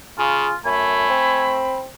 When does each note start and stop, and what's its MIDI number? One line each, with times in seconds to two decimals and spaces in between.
0.18 0.49 49
0.18 0.55 65
0.18 0.53 68
0.65 1.09 42
0.65 1.63 57
0.65 1.46 80
0.65 1.79 83
1.10 1.88 60